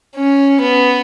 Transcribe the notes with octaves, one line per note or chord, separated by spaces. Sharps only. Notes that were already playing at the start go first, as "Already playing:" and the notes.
C#4
B3